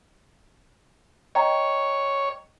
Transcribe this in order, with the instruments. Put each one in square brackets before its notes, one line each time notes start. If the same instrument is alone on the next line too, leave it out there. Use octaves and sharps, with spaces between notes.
[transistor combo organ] C#5 [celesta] D#5 G5 A#5